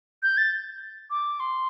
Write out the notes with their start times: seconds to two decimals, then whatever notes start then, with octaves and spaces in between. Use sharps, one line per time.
0.23 G6
0.37 A6
1.10 D6
1.40 C6